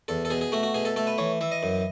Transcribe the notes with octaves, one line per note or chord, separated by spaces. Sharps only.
E2 A4
A4
B2 G#4
G#4
A3 F#4
F#4
B2 G#4
A4
A3 A4
B4
E3 C#5
E3 E5
D#5
F#2